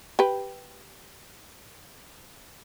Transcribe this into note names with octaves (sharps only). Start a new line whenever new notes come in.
G4 B4